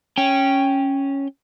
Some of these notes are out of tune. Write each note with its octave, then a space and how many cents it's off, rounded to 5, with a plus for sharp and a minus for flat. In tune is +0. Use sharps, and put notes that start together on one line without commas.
C#4 -5 G5 +0